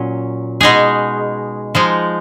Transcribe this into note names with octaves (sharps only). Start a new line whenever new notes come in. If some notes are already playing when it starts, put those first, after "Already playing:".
Already playing: A#2 F#3 C#4
B2 G#3 D#4 G#4
F3 G#3 D#4